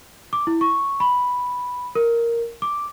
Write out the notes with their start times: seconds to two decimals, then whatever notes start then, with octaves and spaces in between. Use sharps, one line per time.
0.33 D6
0.47 E4
0.61 C#6
1.00 B5
1.95 A#4
2.62 D6